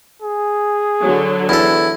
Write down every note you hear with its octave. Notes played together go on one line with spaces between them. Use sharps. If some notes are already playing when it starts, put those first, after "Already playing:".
G#4
D3 F#3
E2 E4 A4